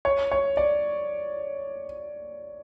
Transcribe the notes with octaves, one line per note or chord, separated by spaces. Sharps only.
C#5
C#5
D5